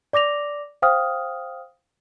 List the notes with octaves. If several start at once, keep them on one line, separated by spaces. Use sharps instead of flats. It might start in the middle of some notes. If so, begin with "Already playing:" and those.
D5 D6 A#6 F7
C5 F5 G5 D#6 F6